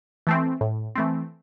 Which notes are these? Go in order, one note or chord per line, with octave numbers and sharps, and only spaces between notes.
E3 A3 C4
A2
E3 A3 C4